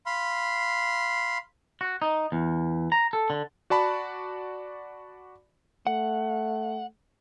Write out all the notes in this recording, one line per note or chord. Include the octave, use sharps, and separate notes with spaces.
F5 B5 C6
F#4
D#4
E2
A#5
A4
D3
F#4 D5 A5 B5
A3 F#5